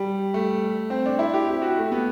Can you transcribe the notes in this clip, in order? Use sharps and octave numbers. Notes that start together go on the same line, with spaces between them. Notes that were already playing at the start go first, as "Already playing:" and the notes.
Already playing: G3
A3
C4
D4
E4
G4
G4
F#4
A3
B3